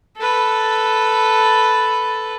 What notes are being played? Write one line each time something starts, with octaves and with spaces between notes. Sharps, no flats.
A4 B4